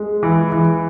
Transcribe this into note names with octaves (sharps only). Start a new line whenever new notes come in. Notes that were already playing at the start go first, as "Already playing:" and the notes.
Already playing: G#3
E3
E3